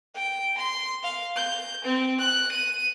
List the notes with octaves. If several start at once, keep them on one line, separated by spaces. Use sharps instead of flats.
G5
C6
F5
G6
C4
F#6
D#7